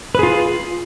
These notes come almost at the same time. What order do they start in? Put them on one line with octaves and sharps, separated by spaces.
B4 G#4 F4